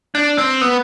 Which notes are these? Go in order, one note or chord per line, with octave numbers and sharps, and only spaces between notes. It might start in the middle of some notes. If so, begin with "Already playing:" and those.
D4
C4
B3